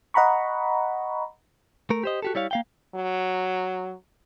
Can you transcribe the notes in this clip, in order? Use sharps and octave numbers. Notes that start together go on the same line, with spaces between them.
D#5 F#5 A#5 B5 C#6
A3 A#4
G4 C5 D#5
F#4 G4 A4
G3 E4 C#5 F5
A#3 F5 G5
F#3